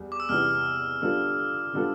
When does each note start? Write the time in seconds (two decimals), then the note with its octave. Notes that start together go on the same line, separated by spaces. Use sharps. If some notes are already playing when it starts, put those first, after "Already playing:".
Already playing: E2 G3
0.12 D6
0.20 E6
0.29 E2 C3 G3 B3 E4 F6
1.02 D3 G3 B3 F4 A4
1.74 D3 G3 B3 F4 A4